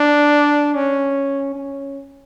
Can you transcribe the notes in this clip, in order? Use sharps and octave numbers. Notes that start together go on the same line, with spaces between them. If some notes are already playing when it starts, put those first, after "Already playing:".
Already playing: D4
C#4
C#4